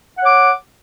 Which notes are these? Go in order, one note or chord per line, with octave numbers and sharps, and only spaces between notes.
C#5 F#5 D6